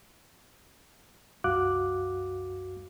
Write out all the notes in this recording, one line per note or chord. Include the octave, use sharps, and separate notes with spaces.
C2 F#2 F#4 F5 D6 F#6